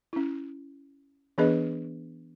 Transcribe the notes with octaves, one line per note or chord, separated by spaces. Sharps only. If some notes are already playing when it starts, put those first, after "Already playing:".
C#4 E4
E3 B3 D4 G#4 B4 D#5